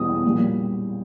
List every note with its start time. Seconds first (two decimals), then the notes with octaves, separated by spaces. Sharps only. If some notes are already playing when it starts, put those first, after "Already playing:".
Already playing: E2 B2 G3 D#6
0.25 A#2 G3